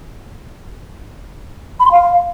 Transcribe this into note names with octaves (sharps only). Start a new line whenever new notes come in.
B5
C6
F5